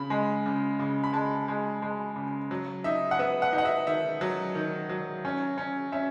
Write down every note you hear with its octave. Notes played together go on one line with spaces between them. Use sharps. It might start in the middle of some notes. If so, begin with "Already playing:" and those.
Already playing: C#3 B5
G#3
C#3
C#3
B5
G#3 A5
G#3
G#3
C#3
F#3
D#4 E5
F#5
B3 E5
F#5
D#4
F#5
E5
D#3 E5
F#3
D#3
F#3
C#4
C#4
C#4 E5